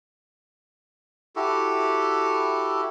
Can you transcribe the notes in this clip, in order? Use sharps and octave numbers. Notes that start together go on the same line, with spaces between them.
E4 F#4 G4 A4